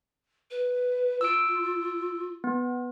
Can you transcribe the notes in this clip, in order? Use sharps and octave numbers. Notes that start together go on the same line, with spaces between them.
B4
F4 E6 D7
B3